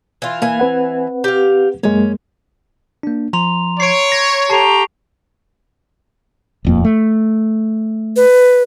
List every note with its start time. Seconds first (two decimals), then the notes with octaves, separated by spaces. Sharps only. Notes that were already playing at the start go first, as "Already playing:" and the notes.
0.22 E3 F4
0.42 E3 A#3 F5 G#5
0.60 C4 B4 F#5
1.24 G4 F5
1.83 F#2 G#3 A#3 C#4
3.03 A#3 D4
3.33 F3 A#5 C6 F7
3.80 C#5 C7 D7
4.12 A#6
4.50 G4 A4 A5 A#5 C#6 C7
6.65 D#1 F2 A#3
6.85 A3
8.16 B4